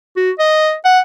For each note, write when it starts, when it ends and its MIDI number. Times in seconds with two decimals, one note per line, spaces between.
0.17 0.31 66
0.39 0.74 75
0.85 1.00 78